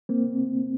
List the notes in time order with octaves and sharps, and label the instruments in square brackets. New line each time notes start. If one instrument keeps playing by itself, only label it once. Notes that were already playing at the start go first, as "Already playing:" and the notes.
[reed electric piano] A#3 C4